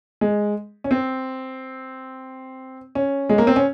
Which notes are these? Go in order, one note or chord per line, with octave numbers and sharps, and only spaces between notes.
G#3
C#4
C4
C#4
G#3
A#3
C4
C#4